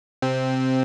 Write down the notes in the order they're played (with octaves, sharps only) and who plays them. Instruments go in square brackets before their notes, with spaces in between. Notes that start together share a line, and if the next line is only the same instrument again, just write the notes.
[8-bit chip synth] C3 C4